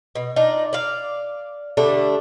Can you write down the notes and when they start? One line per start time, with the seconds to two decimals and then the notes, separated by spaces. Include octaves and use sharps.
0.15 B2
0.36 D4 D#4 F4
0.73 D5 F5
1.77 D3 G3 A3 D4